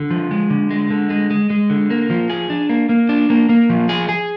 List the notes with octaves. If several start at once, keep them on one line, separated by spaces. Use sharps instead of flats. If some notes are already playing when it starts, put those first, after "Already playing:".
Already playing: D3
F3
G#3
D3
G#3
D3
G#3
G#3
G#3
D3
A#3
F3
G#4
D4
A#3
A#3
D4
A#3
A#3
F3
G#4
G#4